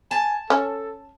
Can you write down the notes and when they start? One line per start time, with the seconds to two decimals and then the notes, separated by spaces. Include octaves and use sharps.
0.11 G#5 A5
0.50 C#4 A4